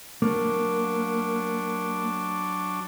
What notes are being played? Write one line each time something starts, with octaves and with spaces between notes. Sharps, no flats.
F#3 A#3 D4 D6